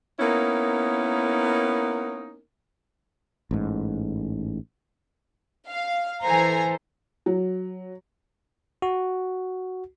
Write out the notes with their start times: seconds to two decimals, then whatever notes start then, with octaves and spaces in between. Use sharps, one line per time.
0.20 A#3 B3 C#4 D#4 E4 A#4
3.51 A1 G#2
5.70 F5
6.23 E3 A4 C5 G#5 A#5
7.26 F#3
8.82 F#4